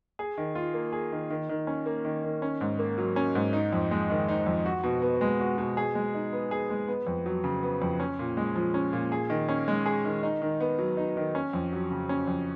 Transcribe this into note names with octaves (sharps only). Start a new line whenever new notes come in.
G#4
D#3
F4
A#3
G#4
D#3
D#3
D#3
C#4
A#3
D#3
D#3
C#4
G#2
A#3
F#3
C#4
G#2
D#4
F2
G#3
D#3
D#4
F2
F#4
B2
B3
G#3
F#4
B2
G#4
G#3
D#4
B3
G#4
G#3
B3
F2
F#3
C#3
B3
F2
C#4
A#2
G#3
F3
C#4
A#2
G#4
D#3
C#4
G#3
G#4
D#3
D#4
D#3
B3
F#3
D#4
D#3
C#4
F2
F#3
C#3
C#4
F2